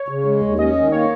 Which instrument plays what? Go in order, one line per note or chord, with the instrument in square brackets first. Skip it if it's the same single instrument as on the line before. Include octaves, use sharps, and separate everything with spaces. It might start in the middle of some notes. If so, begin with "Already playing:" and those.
Already playing: [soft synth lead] C#5
[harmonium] C#3
G#3
D#2
[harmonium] C#4 [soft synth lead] D#5
[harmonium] D#3
[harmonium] A#3 [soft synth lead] C#5